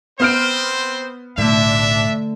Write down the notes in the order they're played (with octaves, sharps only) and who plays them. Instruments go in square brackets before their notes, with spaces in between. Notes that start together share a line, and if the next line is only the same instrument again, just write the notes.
[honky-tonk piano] B3 F6 D7 [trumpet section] C4 B4 C5
[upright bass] B1 A2 [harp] D3 A3 [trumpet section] D4 E5